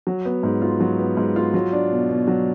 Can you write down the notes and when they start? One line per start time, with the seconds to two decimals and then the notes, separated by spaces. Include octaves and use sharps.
0.07 F#3
0.25 B3
0.43 G#2
0.62 F4
0.81 F#3
0.99 B3
1.17 G#2
1.36 F4
1.54 F#3
1.73 D4
1.91 B2
2.09 B2
2.28 F#3